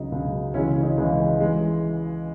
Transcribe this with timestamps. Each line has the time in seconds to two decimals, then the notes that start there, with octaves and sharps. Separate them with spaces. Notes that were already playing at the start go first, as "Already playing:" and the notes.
Already playing: C#2 C#3 F#3 D#4
0.12 C#2 C#3 F#3
0.54 C#2 C#3 E3 G#3 C#4 E4
0.69 C#4 E4
0.83 D#4
0.97 C#2 C#3 E3 G#3 D#4
1.40 E3 G#3